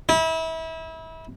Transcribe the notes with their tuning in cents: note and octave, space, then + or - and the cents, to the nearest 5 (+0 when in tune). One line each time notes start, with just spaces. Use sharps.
E4 -30